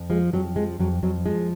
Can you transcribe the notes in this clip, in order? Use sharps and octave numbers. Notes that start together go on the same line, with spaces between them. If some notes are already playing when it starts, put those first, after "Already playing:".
Already playing: F2
F3 G#3
F2 F#3
F3 G#3
F2 F#3
F2 F#3
F3 G#3